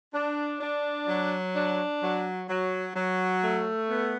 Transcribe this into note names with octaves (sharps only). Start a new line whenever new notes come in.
D4
D4
F#3
D4
F#3
F#3
F#3
A3
B3